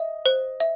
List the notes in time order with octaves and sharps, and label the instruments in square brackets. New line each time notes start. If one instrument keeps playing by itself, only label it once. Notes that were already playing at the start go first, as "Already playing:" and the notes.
Already playing: [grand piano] D#5 [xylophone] E5
[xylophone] C5
E5